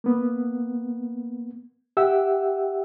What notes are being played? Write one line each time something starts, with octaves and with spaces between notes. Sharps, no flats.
A#3 B3
G4 E5 F#5 G5 E6